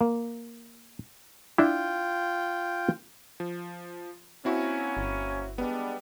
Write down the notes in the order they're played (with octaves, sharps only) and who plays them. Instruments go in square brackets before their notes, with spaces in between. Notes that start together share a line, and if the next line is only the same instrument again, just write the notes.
[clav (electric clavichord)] A#3
[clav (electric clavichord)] D4 E4 [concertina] F4 G5
[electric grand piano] F3
[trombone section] A#3 C#4 [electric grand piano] C4 E4 F#4
[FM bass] G1
[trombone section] G3 G#3 D4 [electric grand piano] B3